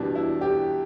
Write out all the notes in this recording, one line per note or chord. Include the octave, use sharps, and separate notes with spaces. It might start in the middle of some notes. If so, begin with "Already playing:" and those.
Already playing: E2 B2 G3 D4
E4
G4